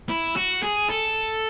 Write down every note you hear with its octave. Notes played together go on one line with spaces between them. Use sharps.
E4
F#4
G#4
A4